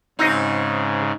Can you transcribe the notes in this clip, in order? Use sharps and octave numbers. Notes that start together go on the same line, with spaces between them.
G#2 C#3 C4 D#4 F#4 D#5